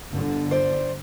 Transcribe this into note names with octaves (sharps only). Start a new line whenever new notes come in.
G1 D3
C5 D5